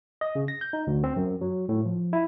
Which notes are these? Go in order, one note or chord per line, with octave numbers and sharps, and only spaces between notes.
D#5
C#3
A#6
G6
D#4
D2
C4
F#2
F#3
A2
F3
E4